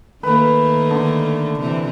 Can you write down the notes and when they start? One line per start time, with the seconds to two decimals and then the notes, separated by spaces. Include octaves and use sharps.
0.23 D#3 A3 A#3 B4
0.91 D3
1.59 C3 E3